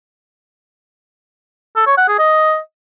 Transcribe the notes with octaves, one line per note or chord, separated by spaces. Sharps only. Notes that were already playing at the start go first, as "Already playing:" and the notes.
A4
C#5
F#5
G#4
D#5